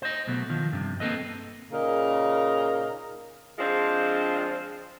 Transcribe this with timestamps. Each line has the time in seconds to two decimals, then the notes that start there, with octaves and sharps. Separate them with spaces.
0.02 C5 D#5
0.27 B1 B2 A3
0.50 D#3 F3
0.73 G2 C3
1.00 A#3 C4 A4 B4 D#5
1.71 A#2 C#3 D#4 A#4 A#5
3.59 F3 G#3 C4 D4 F4